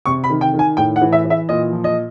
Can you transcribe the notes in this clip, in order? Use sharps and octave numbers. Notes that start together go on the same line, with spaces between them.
C3 C#6
B5
D#3
G5
D#3
G#5
A2 G5
F#5
E3
E5
E3
E5
A#2 D#5
F3
D#5